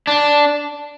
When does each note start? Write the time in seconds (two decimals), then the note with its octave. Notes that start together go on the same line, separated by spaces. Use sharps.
0.07 D4